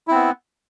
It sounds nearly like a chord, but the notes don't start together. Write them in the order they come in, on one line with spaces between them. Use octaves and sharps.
E4 C4 B3